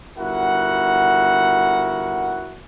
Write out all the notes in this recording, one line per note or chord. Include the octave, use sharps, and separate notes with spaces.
G1 E4 F#4 A#4 F#5